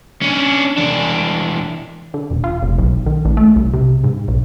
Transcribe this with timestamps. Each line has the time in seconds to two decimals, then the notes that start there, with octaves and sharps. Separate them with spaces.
0.22 C#4 D4
0.78 E2 D4
2.14 D3
2.31 E1
2.44 F4
2.63 F1
2.78 B1
3.06 D#3
3.25 A1
3.37 A3
3.56 C2
3.74 C3
4.04 G#2
4.28 B1